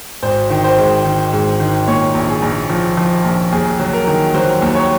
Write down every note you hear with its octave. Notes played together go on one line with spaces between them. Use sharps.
G#1 C5
D#3
C5
G#2
D#3
G#2
D#3
A#2 C#5
A#1
G#4
A#1
F3
F3
A#1
D#2 G#4
F#3
A#4
D#3
F#3 C5
D#2
C#5